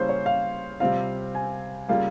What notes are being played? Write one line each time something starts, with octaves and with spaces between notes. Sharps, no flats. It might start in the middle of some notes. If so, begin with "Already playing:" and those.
Already playing: C#3 G3 A#3 C#4 E4 C5
C#5
F5
C3 G3 C4 F4 F5
G#5
C#3 G3 A#3 F4 F5